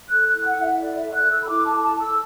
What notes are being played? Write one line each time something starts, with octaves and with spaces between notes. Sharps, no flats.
A4 F#6
F#6
E4
F#5
E4
E5
A4 D5
A4 E5
F#6
A4
E6
B5
E4 D6
A5
A4
A5
A4
E6